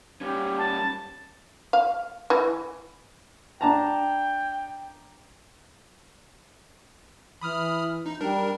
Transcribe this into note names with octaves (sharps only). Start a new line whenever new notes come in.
G3 C#4 G4
A5
F5
E3
D4 G5 A5 A#5
E3 B5 D#6 F6
D#4
G3 D4 A#4